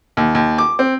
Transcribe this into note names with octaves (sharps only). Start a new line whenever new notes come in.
D#2
D#2
D6
C4